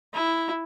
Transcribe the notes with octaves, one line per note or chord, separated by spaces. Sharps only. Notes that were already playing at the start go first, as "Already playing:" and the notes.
E4